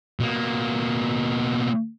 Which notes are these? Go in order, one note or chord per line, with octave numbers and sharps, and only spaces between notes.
B2 A#3